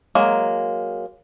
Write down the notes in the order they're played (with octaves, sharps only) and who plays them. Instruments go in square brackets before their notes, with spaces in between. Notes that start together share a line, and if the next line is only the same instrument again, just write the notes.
[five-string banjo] F#3 G#3 A#3